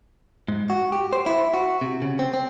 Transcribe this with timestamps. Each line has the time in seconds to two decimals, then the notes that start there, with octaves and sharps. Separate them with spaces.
0.48 G#2
0.70 F#4
0.92 G4
1.13 C5
1.26 E4
1.54 F#4
1.81 C3
2.02 C#3
2.19 C4
2.34 C4